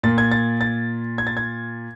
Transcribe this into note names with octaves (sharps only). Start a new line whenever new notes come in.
A#2 A6
G#6
A6
A6
G#6
A6
G#6